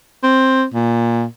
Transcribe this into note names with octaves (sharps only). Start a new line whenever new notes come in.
C4
A#2